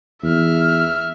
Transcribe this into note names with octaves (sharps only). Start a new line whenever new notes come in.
E2 E5 F6